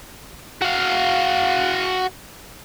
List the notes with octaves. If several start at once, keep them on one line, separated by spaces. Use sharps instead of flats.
F#4 F5